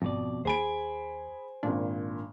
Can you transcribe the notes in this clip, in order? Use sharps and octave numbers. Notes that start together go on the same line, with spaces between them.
G#1 F2 B2 D5
D#2 G#4 C5 G#5 B5 D7
G#1 A#2 D4